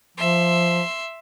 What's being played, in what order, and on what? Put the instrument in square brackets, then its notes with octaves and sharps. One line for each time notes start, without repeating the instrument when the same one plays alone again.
[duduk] F3 [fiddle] E5 C6